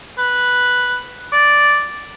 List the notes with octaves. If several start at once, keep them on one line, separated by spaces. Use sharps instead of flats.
B4
D5